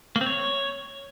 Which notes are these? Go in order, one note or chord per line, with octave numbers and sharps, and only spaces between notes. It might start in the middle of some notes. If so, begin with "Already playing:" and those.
A#3
C4
C#5